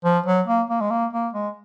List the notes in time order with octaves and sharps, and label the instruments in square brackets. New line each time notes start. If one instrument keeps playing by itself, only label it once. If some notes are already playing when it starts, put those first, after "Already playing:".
[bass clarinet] F3
F#3
A#3
A#3
G#3
A#3
A#3
G#3